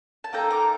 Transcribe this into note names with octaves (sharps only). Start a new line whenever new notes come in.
A5
A#3 D#4 A4 G5 A#5
A#5 D6